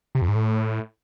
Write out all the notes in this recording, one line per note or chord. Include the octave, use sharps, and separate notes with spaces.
C3
F2
G#2
A2